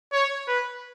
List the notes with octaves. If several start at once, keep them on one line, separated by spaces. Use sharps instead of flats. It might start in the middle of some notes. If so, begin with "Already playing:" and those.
C#5
B4